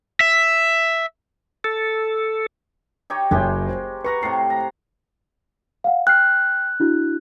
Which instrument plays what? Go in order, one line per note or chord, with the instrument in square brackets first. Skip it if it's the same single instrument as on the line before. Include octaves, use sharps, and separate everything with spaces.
[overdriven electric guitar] E5
[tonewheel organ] A4
[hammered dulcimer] D#4 G4 C#5
[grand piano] F#1 C#5 E5 [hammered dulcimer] G#3 G4
[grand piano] C5
[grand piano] B4 [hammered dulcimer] F#5 A#5 C#6
[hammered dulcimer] A2 C3 [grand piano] C7
[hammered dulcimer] A#5
[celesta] F5 F#5
[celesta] G5 F6 C7 [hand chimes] F#6
[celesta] D4 E4 F#4